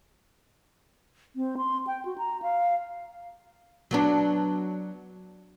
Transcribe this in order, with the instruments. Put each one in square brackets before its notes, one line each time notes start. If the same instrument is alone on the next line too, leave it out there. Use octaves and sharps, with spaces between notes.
[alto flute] C4
C6
G5
F#4
A#5
F5
[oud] F#3 B3 D4